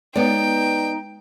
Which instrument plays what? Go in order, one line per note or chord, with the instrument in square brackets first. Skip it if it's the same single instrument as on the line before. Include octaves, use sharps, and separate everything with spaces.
[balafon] G#3 C#5 [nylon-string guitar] B3 D5 [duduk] D#4 [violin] G5